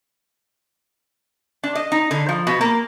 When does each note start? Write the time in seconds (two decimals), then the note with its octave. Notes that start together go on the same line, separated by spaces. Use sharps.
1.63 D4
1.75 D#5
1.92 D#4
2.11 D3
2.29 F3
2.47 B2
2.61 A#3